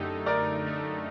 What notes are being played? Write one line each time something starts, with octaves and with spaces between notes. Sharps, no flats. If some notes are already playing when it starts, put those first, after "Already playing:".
Already playing: F#2 D3 A3 D#4 G4
F#2 A#4 D5
D3 A3 D#4